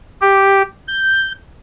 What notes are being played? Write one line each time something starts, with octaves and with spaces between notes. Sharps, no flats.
G4
G6